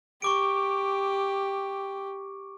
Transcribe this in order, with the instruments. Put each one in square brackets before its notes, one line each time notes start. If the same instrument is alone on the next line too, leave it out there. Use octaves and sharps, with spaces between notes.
[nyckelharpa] G4 [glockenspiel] C#6 D6 D7